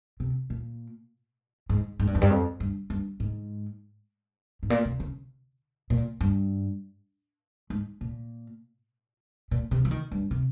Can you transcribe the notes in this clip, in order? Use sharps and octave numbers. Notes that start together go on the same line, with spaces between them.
C3
A#2
G#2
G#2
G2
F2
G2
F2
G2
G2
G#2
G#2
A#2
C3
C#3
A#2
G2
G#2
A#2
A#2
C3
F3
D#3
G2
C3